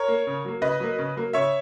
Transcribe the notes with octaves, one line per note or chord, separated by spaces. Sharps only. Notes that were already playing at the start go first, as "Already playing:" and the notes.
Already playing: A#4 C#5
A#3
C#3
F#3 A#3
C#3 B4 D#5
F#3 A#3
C#3
F#3 A#3
C#3 C#5 E5